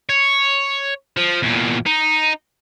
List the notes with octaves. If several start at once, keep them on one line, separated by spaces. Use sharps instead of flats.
C#5
F3
E2 A#2
D#4